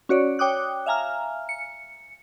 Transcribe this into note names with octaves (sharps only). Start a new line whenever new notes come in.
C#4 F#4 C#5 D5
C#5 G5 D6 D#6 F#6
E5 F5 G#5 A#5 F6
C#7